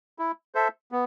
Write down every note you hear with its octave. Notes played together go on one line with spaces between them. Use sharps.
E4
A4 C5 E5
B3